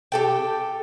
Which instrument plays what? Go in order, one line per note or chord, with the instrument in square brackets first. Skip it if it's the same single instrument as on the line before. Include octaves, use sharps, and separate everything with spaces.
[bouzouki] G4 A4 G5